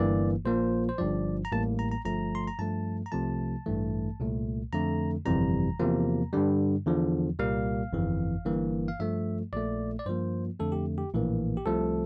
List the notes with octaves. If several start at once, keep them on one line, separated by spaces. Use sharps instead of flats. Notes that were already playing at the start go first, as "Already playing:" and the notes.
Already playing: G1 G2 E3 A#3 D5
A#1 A#2 F3 A#3 C5
C5
G1 G2 F3 D5
A#5
A1 A2 G3 A#3 A5
A#5
A#5
G1 G2 F3 A3 A#5
C6
A#5
G2 F3 A3 A5
A#5
C2 C3 F3 A3 A5
A1 G2 E3 A3
C2 A#2 A3
F2 D3 A3 A#5
G1 F2 C3 E3 G3 A#5
E2 C3 F3 A#3
G2 D3 G3
E2 D3 F3
C2 A#2 G3 A#3 F5
G1 F2 E3
G1 G2 E3 A#3
F5
G2 F3 A3 E5
A#1 A#2 A3 D5
D5
G2 F3 A#3 C5
F2 D3 A3 A4
G4
G4
A#1 A2 E3 A#3
G4
C2 C3 F3 A3 A4